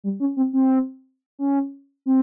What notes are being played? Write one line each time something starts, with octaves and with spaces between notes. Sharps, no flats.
G3
C#4
C4
C4
C#4
C4